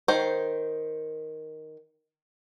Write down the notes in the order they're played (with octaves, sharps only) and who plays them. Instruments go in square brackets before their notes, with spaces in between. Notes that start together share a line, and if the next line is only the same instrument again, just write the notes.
[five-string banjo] D#3 C5